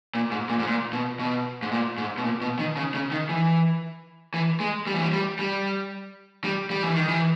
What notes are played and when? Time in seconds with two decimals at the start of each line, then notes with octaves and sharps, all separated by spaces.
0.15 A#2
0.31 G#2
0.49 A#2
0.59 G#2
0.67 A#2
0.93 B2
1.19 B2
1.62 G#2
1.71 A#2
1.98 G#2
2.18 B2
2.24 A#2
2.41 B2
2.59 D#3
2.77 C#3
2.94 C#3
3.11 D#3
3.29 E3
4.34 E3
4.60 G#3
4.87 G3
4.94 E3
5.02 G3
5.13 G3
5.39 G3
6.44 G3
6.70 G3
6.83 E3
6.95 D#3
7.08 E3